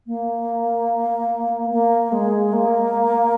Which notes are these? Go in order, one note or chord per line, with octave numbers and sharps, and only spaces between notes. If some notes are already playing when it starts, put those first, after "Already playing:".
A#3
A#3
G#3
A#3